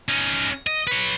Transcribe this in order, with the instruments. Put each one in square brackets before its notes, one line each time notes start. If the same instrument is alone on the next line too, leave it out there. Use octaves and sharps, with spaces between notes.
[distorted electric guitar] C#4 D#4
D#5
B4 C#5